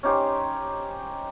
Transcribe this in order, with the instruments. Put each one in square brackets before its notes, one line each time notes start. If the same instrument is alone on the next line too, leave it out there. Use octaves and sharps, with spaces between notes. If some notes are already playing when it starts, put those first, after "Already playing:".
[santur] C#4 D#4 G4 C5